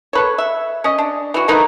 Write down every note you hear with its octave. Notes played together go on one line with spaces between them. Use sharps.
A4 B4 C#5
E5
C#4 D#5
D4
E3 F#4
A3 A#3 D#4 B4